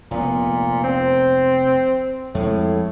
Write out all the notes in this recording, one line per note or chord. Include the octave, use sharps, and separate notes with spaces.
F1 A#2 B3
C4
F2 A2 G#3